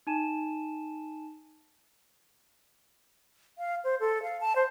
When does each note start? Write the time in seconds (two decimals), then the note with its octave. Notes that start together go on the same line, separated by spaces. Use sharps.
0.07 D#4 G#5 A5 D#7 E7
3.58 F5
3.84 C5
4.00 A4
4.23 F5
4.41 A5
4.55 C5